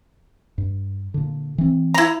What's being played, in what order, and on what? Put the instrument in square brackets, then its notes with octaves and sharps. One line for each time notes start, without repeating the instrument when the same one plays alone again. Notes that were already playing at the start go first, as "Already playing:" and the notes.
[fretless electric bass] G2
A#2 D3
E3 C4
[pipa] E4 A#5